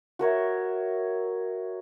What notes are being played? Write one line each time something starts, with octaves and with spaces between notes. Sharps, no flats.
F#4 A#4 C#5 E5